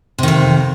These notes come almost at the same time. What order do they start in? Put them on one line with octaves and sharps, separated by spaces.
C3 D#3 F2